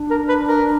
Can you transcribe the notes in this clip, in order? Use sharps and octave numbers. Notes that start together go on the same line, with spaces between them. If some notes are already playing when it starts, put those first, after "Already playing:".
Already playing: D4
A#4
B4
A#4